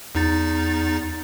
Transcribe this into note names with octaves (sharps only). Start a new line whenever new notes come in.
E2 D#4 A6